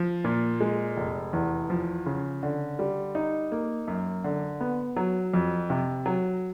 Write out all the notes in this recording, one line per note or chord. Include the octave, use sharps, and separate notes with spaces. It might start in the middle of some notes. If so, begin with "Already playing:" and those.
Already playing: F3
A#2
G#3
F1
E2
F3
C#3
D3
G3
D#4
A#3
F#2
D3
B3
F#3
F2
C3
F#3